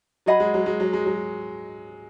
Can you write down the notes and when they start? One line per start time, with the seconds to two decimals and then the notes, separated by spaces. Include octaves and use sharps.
0.26 F#3 G#4 D#5 F#5 B5
0.40 G#3
0.54 F#3
0.66 G#3
0.80 F#3
0.93 G#3
1.06 F#3